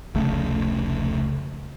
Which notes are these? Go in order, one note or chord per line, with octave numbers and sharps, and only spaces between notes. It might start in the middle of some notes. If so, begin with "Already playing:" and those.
F1 C#2 C#3 A3